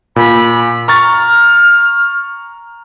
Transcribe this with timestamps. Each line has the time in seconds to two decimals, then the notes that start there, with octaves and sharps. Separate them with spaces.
0.16 A#2 B5
0.88 A#5 C#6 F6 A6